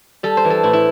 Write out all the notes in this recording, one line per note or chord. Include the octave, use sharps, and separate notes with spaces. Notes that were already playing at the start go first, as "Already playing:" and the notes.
G3 A4
C5
E3
A4
A2 E4
E4